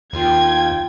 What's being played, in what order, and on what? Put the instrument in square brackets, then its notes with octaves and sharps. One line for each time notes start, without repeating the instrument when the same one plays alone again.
[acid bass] D#2 [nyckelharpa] F4 [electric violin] G5 G#6